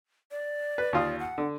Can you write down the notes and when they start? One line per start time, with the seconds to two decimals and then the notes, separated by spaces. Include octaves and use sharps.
0.31 D5
0.78 B4
0.93 D#2 F4 D#6
1.20 F#5
1.38 D3